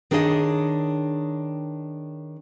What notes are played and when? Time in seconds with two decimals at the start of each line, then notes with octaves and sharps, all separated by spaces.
0.11 D#3 D4 G#4 C#5 D#5